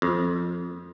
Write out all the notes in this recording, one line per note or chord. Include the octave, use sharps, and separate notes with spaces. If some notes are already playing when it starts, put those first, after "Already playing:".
F2